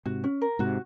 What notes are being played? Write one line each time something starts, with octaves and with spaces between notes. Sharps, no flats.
G#2 C3 F#4
C#4
A#4
G#2 C3 F#4